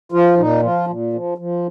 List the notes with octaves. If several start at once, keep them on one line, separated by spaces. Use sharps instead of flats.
F3 F4
A#2 D#4
F3 F4
A#2
F3
F3